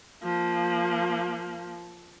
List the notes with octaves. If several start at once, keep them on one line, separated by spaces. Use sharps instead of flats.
F3 A#3